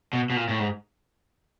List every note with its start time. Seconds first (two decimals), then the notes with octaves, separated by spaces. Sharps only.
0.13 B2
0.30 B2
0.36 A#2
0.49 A2
0.59 G#2